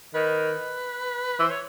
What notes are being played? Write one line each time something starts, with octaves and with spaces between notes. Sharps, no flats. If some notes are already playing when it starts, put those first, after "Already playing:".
D#3 B4
E3 C5
C#5